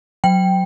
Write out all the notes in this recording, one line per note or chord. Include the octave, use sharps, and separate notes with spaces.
F#3 G5